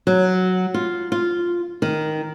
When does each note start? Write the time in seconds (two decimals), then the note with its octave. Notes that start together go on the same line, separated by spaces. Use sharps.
0.07 F#3
0.74 F4
1.12 F4
1.82 D#3